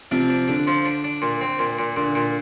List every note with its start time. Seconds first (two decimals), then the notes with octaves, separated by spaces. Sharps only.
0.11 C3 F3 D4
0.30 D4
0.48 D3 D4
0.67 F3
0.85 D4
1.04 D4
1.22 A#2
1.41 C4
1.59 A#2
1.79 A#2
1.96 A#2 D3
2.15 A#2